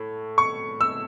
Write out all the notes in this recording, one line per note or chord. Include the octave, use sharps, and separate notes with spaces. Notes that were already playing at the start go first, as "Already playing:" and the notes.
Already playing: A2
C#6
E6